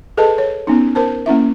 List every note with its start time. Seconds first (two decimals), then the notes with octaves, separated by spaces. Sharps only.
0.17 G#4 A4 B4 D#5 A5
0.38 C#5
0.67 B3 C#4 D#4
0.95 A#4 C5 A5
1.26 A#3 C#4 E4 E5